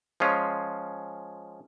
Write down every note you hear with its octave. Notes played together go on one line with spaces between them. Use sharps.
F3 G#3 C#4 F4